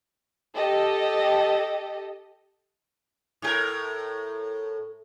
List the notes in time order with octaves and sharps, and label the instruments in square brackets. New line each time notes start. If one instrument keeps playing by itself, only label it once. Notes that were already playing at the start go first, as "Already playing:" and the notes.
[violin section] G4 A4 D#5
[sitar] A2 G4 A#4